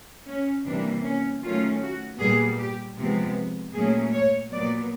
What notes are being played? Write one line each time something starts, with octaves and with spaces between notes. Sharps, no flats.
C#4
C3 E3 G3 A#3 D4
C#4
D#3 F#3 A3 C#4 F4
F#4
A#2 G3 B3 G#4
G4
C3 F3 G#3 B3
A#2 F#3 A3 C#4 G#4
C#5
A#2 F#3 B3 D5